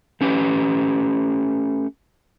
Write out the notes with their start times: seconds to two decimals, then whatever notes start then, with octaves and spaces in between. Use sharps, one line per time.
0.21 A3 C#4 G4 B4